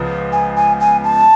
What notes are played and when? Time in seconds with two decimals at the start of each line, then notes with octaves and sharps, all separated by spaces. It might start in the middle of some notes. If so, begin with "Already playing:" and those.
Already playing: C#2 C#3 F3 B3
0.32 G#5
0.56 G#5
0.80 G#5
1.04 A5